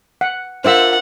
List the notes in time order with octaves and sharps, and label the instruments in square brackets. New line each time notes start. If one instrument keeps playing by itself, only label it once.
[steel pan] F#5
[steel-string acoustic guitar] D4 F4 A#4 [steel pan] C5 E5 E6 [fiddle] F#5